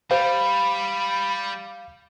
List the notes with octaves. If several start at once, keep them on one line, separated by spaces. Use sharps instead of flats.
G3 G4 C5 F5 B5